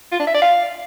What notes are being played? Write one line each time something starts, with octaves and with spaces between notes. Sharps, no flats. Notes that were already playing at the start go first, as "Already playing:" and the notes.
F4
D4
E5
D5
F5